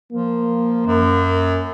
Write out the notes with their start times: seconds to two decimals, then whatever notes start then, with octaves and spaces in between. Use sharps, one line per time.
0.12 F3 A#3
0.86 F#2